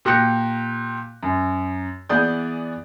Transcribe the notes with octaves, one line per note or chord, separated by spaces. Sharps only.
A#2 G4 F#6 A#6 C#7
F#2
E3 B3 G#4 D5 G6